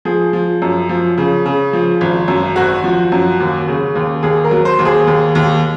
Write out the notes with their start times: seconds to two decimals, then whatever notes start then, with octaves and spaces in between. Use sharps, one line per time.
0.05 F3 G#4
0.33 F3
0.62 F#2
0.89 F3
1.18 C#3
1.46 C#3
1.73 F3
2.01 G#1
2.28 F#2
2.56 G#1 F#4
2.84 F3
3.12 F#2
3.40 D#2
3.68 C#3
3.95 D#2
4.23 D#2 G#4
4.44 A#4
4.51 F#3
4.65 C5
4.79 D#2
4.85 G#4
5.07 D#2
5.35 D#2